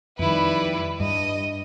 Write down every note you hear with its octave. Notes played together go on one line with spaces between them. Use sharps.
F2 D#3 G3 E4 B4
G2 D#5